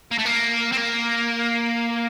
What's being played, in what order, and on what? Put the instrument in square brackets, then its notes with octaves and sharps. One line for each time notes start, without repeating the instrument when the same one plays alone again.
[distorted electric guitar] A#3
A3
A#3
C4
A#3